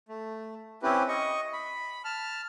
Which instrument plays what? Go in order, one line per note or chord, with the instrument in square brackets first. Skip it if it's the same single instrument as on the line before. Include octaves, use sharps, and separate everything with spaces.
[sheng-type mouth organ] A3
C4 C#4 E4 G4 B4
D#5 C#6
B5
A5 F6